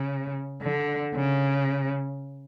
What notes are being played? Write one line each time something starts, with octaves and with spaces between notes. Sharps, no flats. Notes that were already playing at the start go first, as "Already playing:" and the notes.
Already playing: C#3
D3
C#3